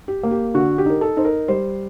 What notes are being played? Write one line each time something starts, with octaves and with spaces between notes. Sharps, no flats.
G4
A#3
G4
D3 F#4
G4
D#4 A#4
A4
D#4 C5
A#4
G3 C5